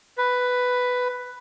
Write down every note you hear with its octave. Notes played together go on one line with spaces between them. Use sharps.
B4